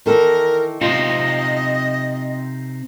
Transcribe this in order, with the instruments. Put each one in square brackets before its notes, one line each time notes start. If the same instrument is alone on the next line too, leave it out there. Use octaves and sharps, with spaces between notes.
[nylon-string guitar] D#3 E3 A4 [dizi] A#4
[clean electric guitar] C3 C4 D#4 [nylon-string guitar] F4 [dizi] D#5